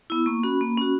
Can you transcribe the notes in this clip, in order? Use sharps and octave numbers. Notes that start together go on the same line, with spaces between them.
B3 E4
A#3 C#6
C#4 F#4 B5
A#3
C#4 F#4